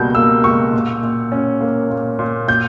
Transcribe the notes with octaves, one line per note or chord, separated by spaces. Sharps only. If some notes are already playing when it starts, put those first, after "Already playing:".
Already playing: C#2 B2 G3 A#3 G6
A#3 E6
C#2 C#6
A#2
A#2
C#4
A#3
A#2
A#2
A#2 G6